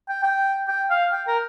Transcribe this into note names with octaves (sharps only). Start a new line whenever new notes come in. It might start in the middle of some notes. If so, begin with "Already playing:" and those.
G5
G5
G5
F5
G5
A#4